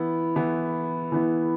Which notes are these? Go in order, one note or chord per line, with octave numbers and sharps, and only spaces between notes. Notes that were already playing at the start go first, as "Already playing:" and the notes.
Already playing: E3 B3 E4
E3 B3 E4
E3 B3 E4